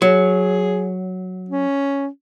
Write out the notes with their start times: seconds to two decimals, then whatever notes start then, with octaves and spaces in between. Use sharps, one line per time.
0.02 F#3 G#4
1.49 C#4